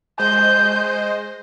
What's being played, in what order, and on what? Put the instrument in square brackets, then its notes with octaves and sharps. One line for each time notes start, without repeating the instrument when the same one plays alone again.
[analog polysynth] G#3 C5 D#5 [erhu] G6